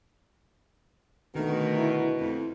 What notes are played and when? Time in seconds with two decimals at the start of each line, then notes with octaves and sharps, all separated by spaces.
1.35 B2 D3 D#3 A3
1.77 E4
2.19 F2